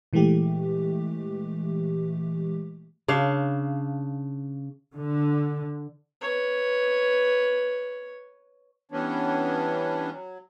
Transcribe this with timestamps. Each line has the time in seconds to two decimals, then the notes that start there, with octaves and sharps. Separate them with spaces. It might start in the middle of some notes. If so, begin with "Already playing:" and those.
0.13 A#2 E3 G#3 A3 G4
3.08 C#3 D4 F5
4.95 D3
6.21 B4 C#5
8.91 E3 G3 B3 C#4 D4
10.12 F#3